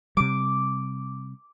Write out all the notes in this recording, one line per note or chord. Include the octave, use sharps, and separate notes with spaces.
C3 G3 D6